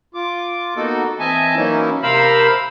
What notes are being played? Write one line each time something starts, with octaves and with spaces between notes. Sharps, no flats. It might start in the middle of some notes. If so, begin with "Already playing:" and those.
F4 D6
A#3 B3 D#4 F#4 A4
E3 C4 D#5 E5 G#5 A5
E3 F#3 A#3 C#4 D#4 E4
C3 A#4 C5 F5 B5 E6